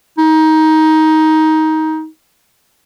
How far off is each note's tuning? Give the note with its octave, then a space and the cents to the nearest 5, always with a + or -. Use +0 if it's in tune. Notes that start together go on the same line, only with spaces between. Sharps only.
D#4 +15